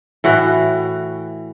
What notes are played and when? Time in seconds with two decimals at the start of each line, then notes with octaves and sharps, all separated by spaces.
0.24 A2 E3 F#4